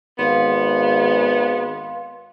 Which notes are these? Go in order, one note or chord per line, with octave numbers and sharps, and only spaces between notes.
G#1 B3 F5 C6